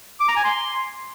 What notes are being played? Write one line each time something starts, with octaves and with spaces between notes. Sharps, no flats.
D6
A#5
G#5
C6